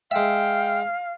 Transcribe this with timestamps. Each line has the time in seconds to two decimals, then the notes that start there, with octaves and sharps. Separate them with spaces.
0.11 G#3 E5 F5 G5